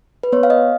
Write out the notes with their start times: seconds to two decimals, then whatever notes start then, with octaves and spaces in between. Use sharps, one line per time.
0.23 B4
0.32 B3 C#5
0.43 F5
0.50 D#5